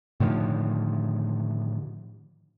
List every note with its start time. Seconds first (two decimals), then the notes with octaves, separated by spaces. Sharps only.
0.20 A2 D3 D#3 F3